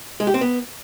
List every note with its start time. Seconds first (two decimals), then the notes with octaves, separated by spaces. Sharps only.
0.20 G#3
0.27 G4
0.34 C4
0.41 B3